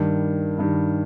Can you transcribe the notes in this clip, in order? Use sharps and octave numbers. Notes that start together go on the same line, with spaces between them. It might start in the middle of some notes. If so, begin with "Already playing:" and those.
Already playing: G2 D#3 G3
G2 D#3 G3